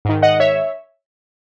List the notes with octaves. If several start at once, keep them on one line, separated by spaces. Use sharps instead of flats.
G#2 D#3
D#5 F#5
C#5 E5